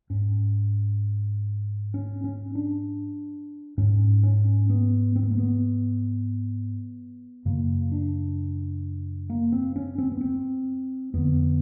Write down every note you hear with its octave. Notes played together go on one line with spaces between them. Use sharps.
G#2 C#4
C#4
C#4
D4
G#2 C#4
C#4
B3
C4
B3
A#3
B3
F#2 C#3 A#3
D4
A#3
C4
C#4
C4
B3
C4
F2 D3 B3